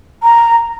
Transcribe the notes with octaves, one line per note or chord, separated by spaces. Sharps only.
A#5